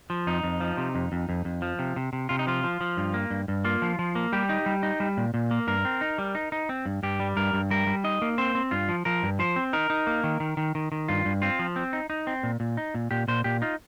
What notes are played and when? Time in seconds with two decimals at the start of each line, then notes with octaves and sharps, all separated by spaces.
0.10 F3
0.27 F2 D#4
0.43 F2
0.60 F3
0.77 C3
0.95 F2
1.12 F2
1.29 F2
1.45 F2
1.62 F3
1.79 C3
1.96 C3
2.13 C3
2.29 C3 F4
2.39 D#4
2.47 F3 F4
2.64 F3
2.81 F3
2.97 G2
3.14 A#3
3.30 G2
3.48 G2
3.65 A#3 F4
3.82 F3
3.99 F3
4.15 A#3
4.32 G3 G4
4.49 D#4
4.66 G3
4.83 D#4
5.00 G3
5.17 A#2
5.34 A#2
5.51 A#3
5.67 G2 A#4
5.85 C4
6.01 D#4
6.18 G3
6.35 D#4
6.52 D#4
6.69 C4
6.86 G2
7.03 G2 G4
7.20 G3
7.37 G2 A#4
7.53 G2
7.71 G3 A#4
7.87 G3
8.04 D#4 D#5
8.22 A#3
8.38 C4 C5
8.55 C4
8.71 G2 F4
8.89 F3
9.05 F3 A#4
9.23 G2
9.39 F3 C5
9.56 C4
9.73 D#4 A#4
9.90 D#4
10.07 A#3
10.24 D#3
10.40 D#3
10.57 D#3
10.75 D#3
10.92 D#3
11.08 G2 F4
11.25 G2
11.42 C4 F4
11.59 F3
11.76 C4
11.93 D#4
12.10 D#4
12.27 C4
12.43 A#2
12.60 A#2
12.77 D#4
12.95 A#2
13.11 A#2 G4
13.28 A#2 C5
13.44 A#2 G4
13.62 D#4 F4